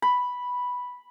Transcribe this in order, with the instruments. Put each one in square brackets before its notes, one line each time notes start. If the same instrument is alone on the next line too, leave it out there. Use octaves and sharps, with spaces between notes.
[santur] B5